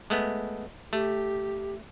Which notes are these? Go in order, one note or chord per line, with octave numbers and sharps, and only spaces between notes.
G#3 A3 B3
A3 G4